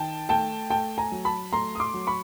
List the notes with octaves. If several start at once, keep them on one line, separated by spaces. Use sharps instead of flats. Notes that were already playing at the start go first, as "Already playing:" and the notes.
Already playing: D#3 G5 A5
A3 G5 A5
A3 G5 A5
G#5 A#5
F#3
A5 B5
A3 A#5 C6
D#6
C6 D6
F#3
B5 C#6